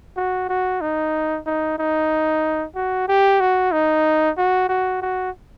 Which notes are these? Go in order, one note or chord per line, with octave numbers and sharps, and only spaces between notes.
F#4
F#4
D#4
D#4
D#4
F#4
G4
F#4
D#4
F#4
F#4
F#4